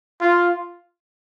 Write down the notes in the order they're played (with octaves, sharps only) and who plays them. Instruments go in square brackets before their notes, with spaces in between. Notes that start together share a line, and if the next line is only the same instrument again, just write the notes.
[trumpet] F4